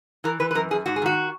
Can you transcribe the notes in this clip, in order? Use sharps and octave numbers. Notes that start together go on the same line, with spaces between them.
E3 A#4
E3 B4
B4
F#2 A#4
F#2 G#4
G#2 F#4
G#4
D#3 F#4